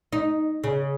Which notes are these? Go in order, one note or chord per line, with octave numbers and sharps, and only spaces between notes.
D#4
C#3